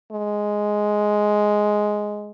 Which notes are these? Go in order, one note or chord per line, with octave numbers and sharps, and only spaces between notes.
G#3